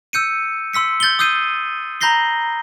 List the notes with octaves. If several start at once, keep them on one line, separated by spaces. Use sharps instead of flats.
E6 G6 C#7 D#7
C6 E6 B6 C#7
G6 A6 F#7 G7
D#6 E6 G6 C7 D#7
A#5 B5 G6 A#6 C7 G7